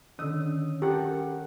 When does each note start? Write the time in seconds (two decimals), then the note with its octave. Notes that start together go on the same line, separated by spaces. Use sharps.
0.19 D3 D#3 C#4 D#6 E6
0.82 G4 A4 A#4 F#5